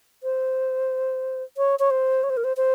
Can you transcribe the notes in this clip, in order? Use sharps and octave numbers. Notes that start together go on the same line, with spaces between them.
C5
C#5
C#5
C5
C#5
C5
A#4
C5
C5